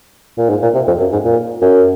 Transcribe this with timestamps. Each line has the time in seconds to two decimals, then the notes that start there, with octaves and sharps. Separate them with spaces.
0.37 A#2
0.50 G#2
0.62 A#2
0.74 C3
0.88 F2
1.00 F#2
1.12 G#2
1.25 A#2
1.62 F#2